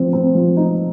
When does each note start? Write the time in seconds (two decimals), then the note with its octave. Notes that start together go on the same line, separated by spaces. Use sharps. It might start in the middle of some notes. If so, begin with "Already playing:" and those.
Already playing: F3 C4
0.13 C4
0.35 F3
0.57 D#4